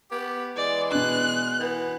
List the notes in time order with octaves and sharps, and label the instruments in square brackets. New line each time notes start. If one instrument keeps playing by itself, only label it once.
[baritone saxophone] B3 [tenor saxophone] G4
[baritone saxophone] E3 [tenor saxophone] G#3 [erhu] D5
[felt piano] B2 D4 [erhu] F#6
[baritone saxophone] E3 [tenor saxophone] B3